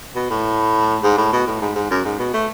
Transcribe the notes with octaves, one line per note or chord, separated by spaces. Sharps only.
B2
A2
G#2
A2
B2
A2
G#2
G#2
F#2
G#2
B2
A3